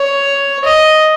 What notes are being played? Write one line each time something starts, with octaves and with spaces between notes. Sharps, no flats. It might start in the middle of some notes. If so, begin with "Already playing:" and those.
Already playing: C#5
D#5